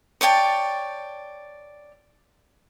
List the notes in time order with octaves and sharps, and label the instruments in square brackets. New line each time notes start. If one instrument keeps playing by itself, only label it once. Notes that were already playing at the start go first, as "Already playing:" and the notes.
[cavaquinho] C#5 D5 G5 A5